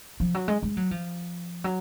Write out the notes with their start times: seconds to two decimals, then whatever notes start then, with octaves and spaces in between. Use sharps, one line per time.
0.20 F3
0.34 F#3
0.48 G#3
0.63 G#3
0.77 F#3
0.91 F3
1.64 F#3